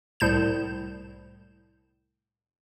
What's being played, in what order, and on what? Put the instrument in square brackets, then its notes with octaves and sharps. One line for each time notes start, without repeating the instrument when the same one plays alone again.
[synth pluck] C2 A2 G6 E7